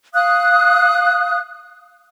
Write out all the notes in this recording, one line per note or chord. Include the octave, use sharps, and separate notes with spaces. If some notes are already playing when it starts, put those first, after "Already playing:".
F5 D#6 F#6